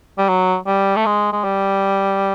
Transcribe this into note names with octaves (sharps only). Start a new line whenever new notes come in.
G3
F#3
G3
A3
G#3
G#3
G3